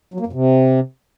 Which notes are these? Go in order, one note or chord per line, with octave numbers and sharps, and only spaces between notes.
F#3
A#3
F#2
C3